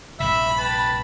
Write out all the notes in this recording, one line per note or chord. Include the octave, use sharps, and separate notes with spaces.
A#1 G2 C3 E5 B5
B4 G5 A5